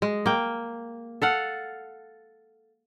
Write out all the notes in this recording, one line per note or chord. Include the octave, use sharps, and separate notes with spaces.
G#3
A#3 G5
A4 F5 F#5